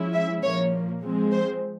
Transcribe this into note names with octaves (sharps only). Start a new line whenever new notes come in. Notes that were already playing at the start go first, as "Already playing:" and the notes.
Already playing: F3 G#3 C#4 E4
E5
A#2 F3 A#3 C#5
F3 G#3 C4
C5